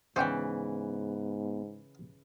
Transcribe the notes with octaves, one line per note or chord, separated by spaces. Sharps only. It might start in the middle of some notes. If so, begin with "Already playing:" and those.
G#2 C#3 E3 B3 C5 D5 G5